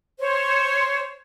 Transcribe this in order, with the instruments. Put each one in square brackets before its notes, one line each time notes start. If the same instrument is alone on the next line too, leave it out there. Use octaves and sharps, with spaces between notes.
[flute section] C5 C#5